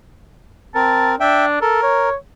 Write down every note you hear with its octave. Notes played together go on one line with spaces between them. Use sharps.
C4 A#4 A5
D4 E5 G5
A4 A#4
C#5